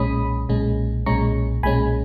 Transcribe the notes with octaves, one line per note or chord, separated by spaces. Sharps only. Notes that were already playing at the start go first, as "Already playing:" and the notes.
Already playing: B1 A#2 G#3 C#4 B5 D#6
B1 A#2 G#3 C#4
B1 A#2 G#3 C#4 A#5 C#6
B1 A#2 G#3 C#4 G#5 B5